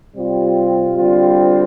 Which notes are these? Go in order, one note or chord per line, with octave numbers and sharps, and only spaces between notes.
C3 G3 C4 F4
D3 G3 C4 F4